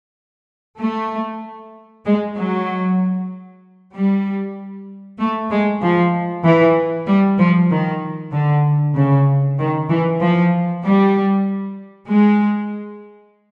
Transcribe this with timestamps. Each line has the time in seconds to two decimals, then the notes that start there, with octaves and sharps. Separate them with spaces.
0.80 A3
2.06 G#3
2.37 F#3
3.94 G3
5.19 A3
5.50 G#3
5.82 F3
6.44 E3
7.08 G3
7.38 F3
7.70 D#3
8.33 D3
8.95 C#3
9.59 D#3
9.89 E3
10.21 F3
10.84 G3
12.09 G#3